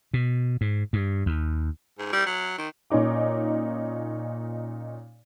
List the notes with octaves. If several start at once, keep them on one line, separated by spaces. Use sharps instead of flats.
B2
G#2
G2
D#2
G#2
G3
F#3
D#3
A#2 C#4 D#4 D6